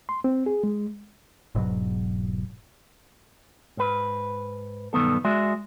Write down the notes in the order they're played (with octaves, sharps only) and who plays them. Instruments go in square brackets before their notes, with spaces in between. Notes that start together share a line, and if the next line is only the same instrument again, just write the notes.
[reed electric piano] C6
C4
G#4
G#3
[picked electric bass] E1 G#2 B2 F#3
[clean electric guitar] G#2 B4
B1 G2 D#3 B3 A4
G#3 F#4 D5 E5